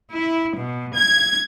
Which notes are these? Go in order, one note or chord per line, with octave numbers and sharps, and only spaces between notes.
E4
B2
G#6